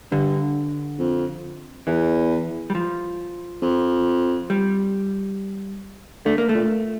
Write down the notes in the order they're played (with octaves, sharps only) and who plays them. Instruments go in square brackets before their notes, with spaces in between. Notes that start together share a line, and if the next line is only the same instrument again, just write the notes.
[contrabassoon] G2 [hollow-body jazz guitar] D3
[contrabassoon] F2
[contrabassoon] E2 [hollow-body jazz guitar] E3
[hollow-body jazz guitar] G3
F3
[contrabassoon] F2
[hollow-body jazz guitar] G3
[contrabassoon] D3 [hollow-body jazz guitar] A3
[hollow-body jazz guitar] A#3
A3
[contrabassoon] A#2